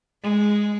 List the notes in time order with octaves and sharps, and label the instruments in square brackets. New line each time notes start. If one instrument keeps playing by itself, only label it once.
[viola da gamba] G#3